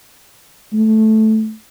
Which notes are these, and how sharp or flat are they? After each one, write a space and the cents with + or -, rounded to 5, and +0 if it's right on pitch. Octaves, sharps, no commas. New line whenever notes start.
A3 -10